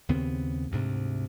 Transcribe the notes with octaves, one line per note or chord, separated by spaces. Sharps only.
D#2 C#3 B3 C4
D2 G#2 C3